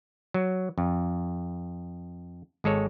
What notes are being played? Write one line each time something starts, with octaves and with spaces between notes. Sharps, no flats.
F#3
F2
G#1 G#3 A4 C#5